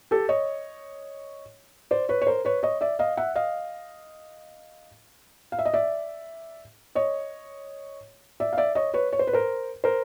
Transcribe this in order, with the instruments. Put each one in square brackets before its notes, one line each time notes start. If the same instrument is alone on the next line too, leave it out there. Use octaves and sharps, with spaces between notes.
[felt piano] G4 A4
C#5 D#5
C5 D5
B4 C#5
C#5
A#4 C5
B4 C#5
C#5 D#5
D5 E5
D#5 F5
E5 F#5
D#5 F5
F5
E5
D#5
D5 E5
C#5 D#5
D5 E5
F5
D5 E5
C#5 D#5
B4 C#5
C#5
C5
B4
A#4 C5
A#4 C5